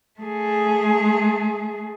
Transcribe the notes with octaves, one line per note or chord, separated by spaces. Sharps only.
A3 G#4